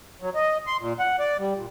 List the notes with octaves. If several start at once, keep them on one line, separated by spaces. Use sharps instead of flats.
F#3
D#5
C6
A#2
F#5
D5
G3
A#2